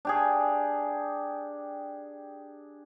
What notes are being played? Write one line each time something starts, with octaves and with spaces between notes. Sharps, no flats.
D4 G4 G#4